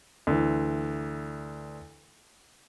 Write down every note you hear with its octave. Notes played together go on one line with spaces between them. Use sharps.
D2 E3